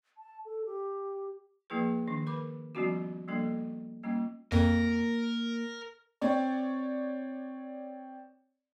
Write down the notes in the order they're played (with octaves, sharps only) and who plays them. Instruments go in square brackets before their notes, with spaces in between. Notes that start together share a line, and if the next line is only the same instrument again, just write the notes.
[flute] A5
A4
G4
[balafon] F3 A#3 E4 G#4 B4
D#3 D4
A#4 B4 B5 D6
F3 G3 B3 C#4 F4 F#4
F3 G3 A#3 D4 A4
G3 A#3 C#4 F4
[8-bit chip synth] F2 [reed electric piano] A#3 [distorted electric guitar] A#4
[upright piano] C4 C#5 D5